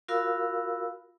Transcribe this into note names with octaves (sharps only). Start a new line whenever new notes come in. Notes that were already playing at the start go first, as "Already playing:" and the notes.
F4 F#4 A#4 F5 B5 E6